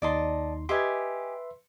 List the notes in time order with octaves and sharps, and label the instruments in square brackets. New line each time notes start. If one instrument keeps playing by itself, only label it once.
[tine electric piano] D#2 D#4 C6 [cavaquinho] D5 D#5 A5
[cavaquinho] G4 D#5 G#5 [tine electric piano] B4 E5 C6